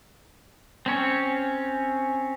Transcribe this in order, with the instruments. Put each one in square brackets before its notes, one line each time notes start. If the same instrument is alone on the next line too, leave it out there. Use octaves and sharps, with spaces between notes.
[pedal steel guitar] C4 C#4 C#5